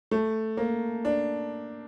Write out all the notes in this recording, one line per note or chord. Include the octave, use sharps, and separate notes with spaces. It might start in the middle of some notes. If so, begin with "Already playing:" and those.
A3
A#3
D4